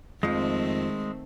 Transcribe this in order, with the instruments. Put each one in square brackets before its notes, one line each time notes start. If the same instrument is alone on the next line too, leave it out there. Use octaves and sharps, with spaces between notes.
[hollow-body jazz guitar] F2 F3 [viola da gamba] D#3 A3 C4 [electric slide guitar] G#3